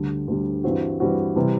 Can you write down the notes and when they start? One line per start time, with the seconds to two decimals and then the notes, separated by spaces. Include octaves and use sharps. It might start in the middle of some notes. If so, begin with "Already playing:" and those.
Already playing: D2 D3 G3
0.28 D2 D3 G3
0.64 G2 E3 G3 C4 F#4
1.00 G2 E3 G3 C4 F#4
1.36 C3 E3 G3